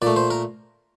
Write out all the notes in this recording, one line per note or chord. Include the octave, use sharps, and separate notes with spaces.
A#2 A3 D5
C5
A#4